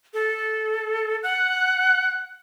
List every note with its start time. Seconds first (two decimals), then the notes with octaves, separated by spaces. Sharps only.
0.14 A4
1.23 F#5 F#6